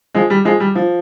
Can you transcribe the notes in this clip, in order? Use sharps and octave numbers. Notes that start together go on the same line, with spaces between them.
F3 G#3
G3
F3 G#3
G3
F3